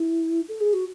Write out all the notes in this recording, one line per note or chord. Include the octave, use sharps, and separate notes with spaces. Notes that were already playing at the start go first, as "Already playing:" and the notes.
Already playing: E4
A4
G#4
F#4